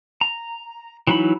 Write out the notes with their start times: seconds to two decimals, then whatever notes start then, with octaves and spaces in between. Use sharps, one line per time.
0.21 A#5
1.07 E3 F#3 D#4 E4 B5